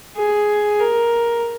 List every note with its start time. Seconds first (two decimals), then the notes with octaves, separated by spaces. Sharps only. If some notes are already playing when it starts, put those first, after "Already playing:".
0.16 G#4
0.80 A#4